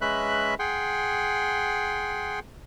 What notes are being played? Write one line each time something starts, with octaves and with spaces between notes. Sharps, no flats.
G#3 C#4 B4 E5 B5 F#6
G#4 F#5 G5 C6